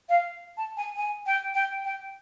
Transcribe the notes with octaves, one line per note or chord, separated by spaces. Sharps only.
F5
A5
G#5
G#5
G5
G5
G5